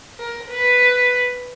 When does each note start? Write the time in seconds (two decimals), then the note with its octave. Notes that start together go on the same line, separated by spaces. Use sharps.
0.19 A#4
0.50 B4